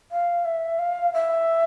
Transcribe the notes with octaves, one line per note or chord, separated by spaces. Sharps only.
F5
E5
F5
E5